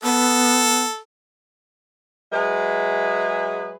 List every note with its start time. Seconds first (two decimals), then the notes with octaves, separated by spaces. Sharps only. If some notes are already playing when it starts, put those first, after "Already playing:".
0.04 B3 A4
2.32 F#3 G#3 G#4 B4 E5